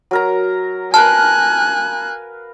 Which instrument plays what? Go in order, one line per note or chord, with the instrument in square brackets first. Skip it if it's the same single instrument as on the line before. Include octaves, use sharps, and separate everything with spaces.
[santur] F#3 A#4 A#5
[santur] A#4 B4 F5 [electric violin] G#5 F#6 [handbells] A5